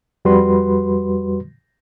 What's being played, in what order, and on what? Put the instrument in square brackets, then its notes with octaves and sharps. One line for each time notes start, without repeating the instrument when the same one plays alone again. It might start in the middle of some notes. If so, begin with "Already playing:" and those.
[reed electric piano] F2 G3 F#4 B4 C6